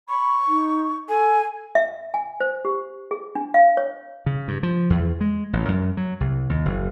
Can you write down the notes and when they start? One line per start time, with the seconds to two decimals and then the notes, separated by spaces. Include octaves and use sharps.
0.09 B5 C#6
0.48 D#4
1.09 A4 G#5
1.75 E5
2.14 G#5
2.40 C5
2.65 G4
3.11 G#4
3.35 D4
3.54 F5
3.77 C#5
4.26 C#3
4.48 G2
4.63 F3
4.90 E2
5.21 G#3
5.53 A1
5.68 F#2
5.97 F#3
6.20 C2
6.49 D#2
6.65 F#1